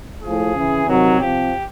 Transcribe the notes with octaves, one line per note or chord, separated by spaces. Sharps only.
A2 F3 G#4
C#3 E3
C3 D#3 F#3
C3 F3 G4